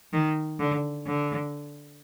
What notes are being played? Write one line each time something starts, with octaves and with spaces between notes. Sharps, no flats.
D#3
D3
D3